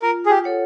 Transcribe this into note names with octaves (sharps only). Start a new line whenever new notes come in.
F4 A#4
G#4
G4
A4 C#5 F#5